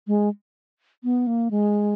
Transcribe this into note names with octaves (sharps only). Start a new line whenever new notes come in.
G#3
B3
A#3
G#3